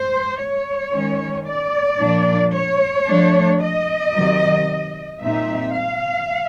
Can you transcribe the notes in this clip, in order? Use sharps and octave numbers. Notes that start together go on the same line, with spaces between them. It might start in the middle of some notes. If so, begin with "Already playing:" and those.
Already playing: C5
C#5
D#3 G#3 C#4
D5
A#2 F3 A#3 D4
C#5
F3 A3 D4
D#5
C3 D#3 F#3
A#2 G3 C4 D#4 E5
F5